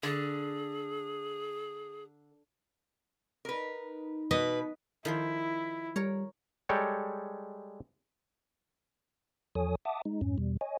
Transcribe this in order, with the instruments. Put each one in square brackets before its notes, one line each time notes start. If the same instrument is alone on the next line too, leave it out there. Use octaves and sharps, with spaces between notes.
[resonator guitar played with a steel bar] D3 [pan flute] G#4
[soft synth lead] D#4 [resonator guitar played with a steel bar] A#4 B4
[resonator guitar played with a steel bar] B2 [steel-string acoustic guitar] B4 [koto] D#5
[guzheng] D#3 F3 C5 [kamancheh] E4
[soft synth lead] G3 [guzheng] A#4 C#5
[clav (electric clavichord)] G3 G#3 A4 C#5 G5
[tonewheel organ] E2 F3 A4 C#5 G#5 D#6
E5 F#5 A5 D6 D#6
G#3 D#4
F2 G#2 C#4
E2 B2 G3
C#5 D#5 G#5